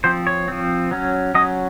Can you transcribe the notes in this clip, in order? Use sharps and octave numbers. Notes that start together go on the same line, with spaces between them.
F3 C4 C5
C#5
F3 C4
F#3 C#4
F#3 C#4 D#5